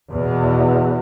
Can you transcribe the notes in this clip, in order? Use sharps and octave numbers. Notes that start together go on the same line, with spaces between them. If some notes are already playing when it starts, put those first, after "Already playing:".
E2 B2